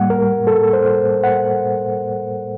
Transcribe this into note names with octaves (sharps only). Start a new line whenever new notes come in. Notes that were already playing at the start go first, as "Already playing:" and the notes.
Already playing: A2 G3 A#3 F#5
A#4
A4
C5
F#5